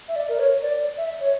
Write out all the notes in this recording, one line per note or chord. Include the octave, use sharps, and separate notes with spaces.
E5
D5
A#4
C#5
D5
E5
C#5